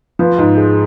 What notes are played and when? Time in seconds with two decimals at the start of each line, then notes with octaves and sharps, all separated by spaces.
0.19 F3 B4
0.38 G#2
0.57 G#3